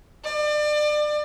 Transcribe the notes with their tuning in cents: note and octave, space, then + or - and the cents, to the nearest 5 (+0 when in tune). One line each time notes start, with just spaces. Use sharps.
D5 +30